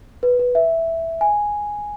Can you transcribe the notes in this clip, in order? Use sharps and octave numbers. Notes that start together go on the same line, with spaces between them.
B4
B4
E5
G#5